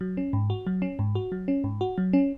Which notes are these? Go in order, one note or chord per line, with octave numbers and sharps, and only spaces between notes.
F#3
C#4
G#2
F#4
F#3
C#4
G#2
F#4
F#3
C#4
G#2
F#4
F#3
C#4